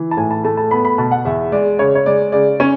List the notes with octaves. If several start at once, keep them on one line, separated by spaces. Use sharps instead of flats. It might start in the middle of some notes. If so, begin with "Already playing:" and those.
Already playing: E3
A5
A2 G#5
A5
A3 A5
A5
B3 B5
B5
B2 A5
F#5
E2 E5
G#3 D5
C#3 C#5
C#5
G#3 D5
C#3 D5
C#4 C#5